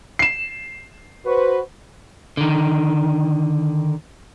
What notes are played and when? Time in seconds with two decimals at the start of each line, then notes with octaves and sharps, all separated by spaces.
0.19 C7 E7
1.26 F#4 B4 C5
2.37 D3 D#3